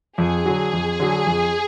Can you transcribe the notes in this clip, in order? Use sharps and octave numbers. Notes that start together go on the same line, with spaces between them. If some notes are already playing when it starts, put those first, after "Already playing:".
F2 G#4
D3 F#3
F2
D3 F#3
F2